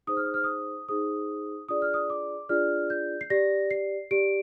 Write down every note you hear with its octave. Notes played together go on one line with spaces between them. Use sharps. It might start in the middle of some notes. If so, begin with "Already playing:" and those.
D#4 G#4 C5 D#6
F6
D#6
F6
D#6
D#4 G#4 C5 D#6
D4 F4 G#4 D5 D#6
F6
D#6
D6
D4 F4 G#4 D5 F6
G6
C7
G4 D5 A#6
C7
G4 D5 D7